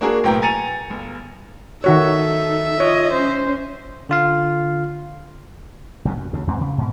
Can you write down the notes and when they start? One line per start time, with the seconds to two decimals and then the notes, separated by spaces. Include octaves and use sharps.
0.01 A#3 D4 F#4 G#4 A#4
0.23 B1 A2 A#3 B3 G5 A#5
0.42 G#5 A#5 A6 C#7 D#7 F7
0.90 G1
1.84 D#3 D#4 F#4 A4 C#5 E5
2.80 F4 C#5 D#5
3.12 C#4 C5
4.09 D3 F4 F5
6.05 F#1 F#2 B2
6.17 F#2
6.33 D2 C#3
6.47 E2 G#2 C4
6.61 C#3
6.78 G#2 B2